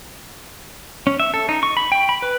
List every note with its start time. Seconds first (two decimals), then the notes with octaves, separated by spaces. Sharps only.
1.07 C#4
1.20 E5
1.34 A4
1.49 D#4
1.63 C#6
1.77 B5
1.92 G5
2.09 B5
2.22 B4